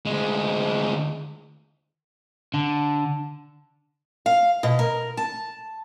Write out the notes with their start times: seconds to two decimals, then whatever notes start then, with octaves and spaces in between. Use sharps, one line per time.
0.06 D2 G#3
2.54 D3
4.26 F5
4.63 B2
4.79 A#4
5.17 A5